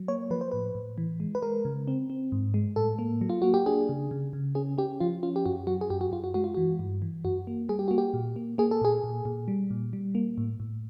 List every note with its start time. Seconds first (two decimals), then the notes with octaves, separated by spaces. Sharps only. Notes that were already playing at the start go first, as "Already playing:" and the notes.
Already playing: F#3
0.08 A#3 C#5
0.30 F3 B4
0.41 C5
0.51 A2 B4
0.75 A2
0.98 E3
1.20 G#3
1.35 B4
1.42 G#3 A#4
1.65 C#3
1.88 C4
2.10 C4
2.32 G#2
2.54 G#3
2.76 A2 A4
2.99 A#3
3.21 F#3
3.29 F4
3.42 A#3 F#4
3.54 G4
3.66 D4 G#4
3.89 C#3
4.11 C#3
4.33 C#3
4.55 C#4 G#4
4.78 C#4 G4
5.00 F3 F4
5.23 C#4 F4
5.36 G4
5.46 F#2 F#4
5.67 F#3 F#4
5.81 G#4
5.90 F#2 G4
6.01 F#4
6.12 F#2 F4
6.24 F#4
6.34 G#3 F#4
6.44 F4
6.54 E3 F#4
6.79 G2
7.02 E3
7.25 F#2 F#4
7.47 A#3
7.69 G3 G#4
7.79 G4
7.88 A#3 F#4
7.98 G4
8.14 A#2
8.36 A#3
8.58 A#3 G#4
8.71 A4
8.81 A#2 G#4
9.04 A#2
9.25 A#2
9.48 G3
9.71 A#2
9.93 G3
10.15 A#3
10.38 A2
10.60 A2